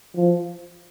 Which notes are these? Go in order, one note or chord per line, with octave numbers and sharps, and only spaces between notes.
F3